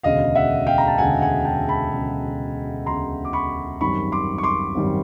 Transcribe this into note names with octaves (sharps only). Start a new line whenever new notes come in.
E1 D2 C#3 D#5 F5
E5 F#5
F5 G5
A#5
A5
E1 D2 C#3 F#5 G#5
F#5 G#5
G5 A5
A5 B5
E1 D2 C#3
E1 D2 C#3 A#5 C6
D6
B5 C#6
G#1 F#2 D#3 G3 B5 C#6
C6 D6
C#6
C6 D6
G#1 F#2 D#3 G3